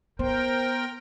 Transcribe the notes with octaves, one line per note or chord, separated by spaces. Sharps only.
B3 A#4 C5 G5